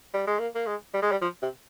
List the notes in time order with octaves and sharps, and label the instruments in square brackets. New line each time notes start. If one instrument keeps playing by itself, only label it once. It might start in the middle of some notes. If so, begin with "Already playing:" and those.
[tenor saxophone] G3
G#3
A#3
A#3
G#3
G3
G#3
G3
F3
C3